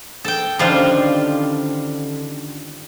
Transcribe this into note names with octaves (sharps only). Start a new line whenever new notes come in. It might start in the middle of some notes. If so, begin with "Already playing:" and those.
A4 G5
D3 D#3 F3 G3 C#4 D4 F4 F5